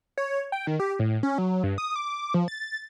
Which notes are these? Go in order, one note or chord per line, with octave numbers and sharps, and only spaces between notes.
C#5
G5
D#3
G4
A2
C#4
F#3
G2
D#6
D6
F3
A6